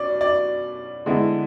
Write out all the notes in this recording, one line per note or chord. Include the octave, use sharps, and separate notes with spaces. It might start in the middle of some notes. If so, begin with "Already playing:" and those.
Already playing: B2 C#4 D5
D5
D3 G#3 B3 E4